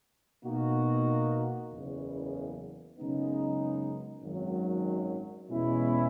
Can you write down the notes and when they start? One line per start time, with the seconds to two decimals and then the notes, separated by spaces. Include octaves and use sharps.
0.44 B2 A#3 D#4 F#4
1.71 F#1 E2 C#3
2.97 F#2 C#3 G#3 B3 D#4
4.23 G#1 F#2 D#3 F#3
5.49 E2 B2 G#3 C#4 E4